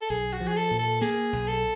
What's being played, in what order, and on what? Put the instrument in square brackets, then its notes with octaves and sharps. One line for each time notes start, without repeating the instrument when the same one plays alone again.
[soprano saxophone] A4
[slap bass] B1 [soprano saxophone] G#4
[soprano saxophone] F#4
[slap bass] F3
[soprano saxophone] G#4
A4
[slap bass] A#2
[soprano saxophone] A4
[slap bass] A#3 [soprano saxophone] G#4
[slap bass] B1
[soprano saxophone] A4